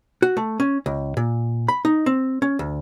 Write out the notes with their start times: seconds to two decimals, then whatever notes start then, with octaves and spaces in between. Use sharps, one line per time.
0.22 F#4
0.37 A3
0.60 C#4
0.86 C#2
1.17 A#2
1.68 B5
1.85 D#4
2.06 C4
2.42 C#4
2.59 D2